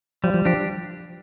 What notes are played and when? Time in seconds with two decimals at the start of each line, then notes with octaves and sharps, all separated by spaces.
0.23 F3 G3
0.34 F3
0.45 F3 D4 G4